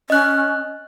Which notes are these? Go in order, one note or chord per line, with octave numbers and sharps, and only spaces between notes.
C#4 D#5 F#6